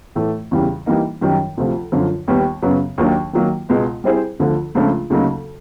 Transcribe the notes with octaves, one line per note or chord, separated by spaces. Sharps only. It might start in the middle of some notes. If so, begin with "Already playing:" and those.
A2 E3 A3
E2 C#3 E3 G3
E3 G3 A#3 D#4
F#2 D#3 G3
D2 C3 F3
F#2 D3 F3
D#2 D#3 G3 B3
F#2 C#3 F#3 B3
D#2 D#3 F#3 A#3 D4
D#3 F#3 A#3
C#2 B2 G#3 B3
G3 C4 E4 G#4 C5
D2 D3 F3
C#2 C#3 F3 A3 D4
D2 C#3 F#3 A#3 D#4